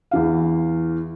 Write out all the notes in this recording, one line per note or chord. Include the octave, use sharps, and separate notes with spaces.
E2 E3 F5